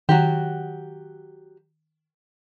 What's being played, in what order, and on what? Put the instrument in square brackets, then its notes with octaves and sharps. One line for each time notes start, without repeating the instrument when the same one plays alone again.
[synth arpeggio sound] D#3 [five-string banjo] F#3 F#4 G4